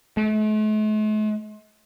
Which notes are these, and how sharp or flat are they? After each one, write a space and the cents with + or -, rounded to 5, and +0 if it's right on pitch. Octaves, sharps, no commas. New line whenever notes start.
A3 -45